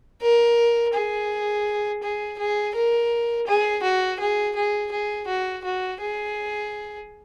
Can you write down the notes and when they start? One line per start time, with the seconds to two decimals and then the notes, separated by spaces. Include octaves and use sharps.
0.22 A#4
0.94 G#4
2.03 G#4
2.38 G#4
2.75 A#4
3.47 G#4
3.83 F#4
4.20 G#4
4.56 G#4
4.92 G#4
5.28 F#4
5.64 F#4
6.01 G#4